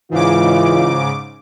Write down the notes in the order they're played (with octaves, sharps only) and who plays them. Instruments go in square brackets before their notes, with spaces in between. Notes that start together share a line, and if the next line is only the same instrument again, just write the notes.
[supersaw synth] G#2 C#3 D6 [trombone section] E3 F4